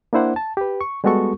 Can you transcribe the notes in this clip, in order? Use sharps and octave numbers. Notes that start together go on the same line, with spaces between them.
A#3 D4 E4 C5 F#5
A5
G4 B4
C#6
G3 G#3 B3 F#4 A4 C#6